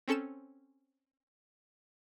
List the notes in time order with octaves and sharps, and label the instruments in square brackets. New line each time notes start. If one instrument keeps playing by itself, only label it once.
[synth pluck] C4 C#4 A4 C#7 E7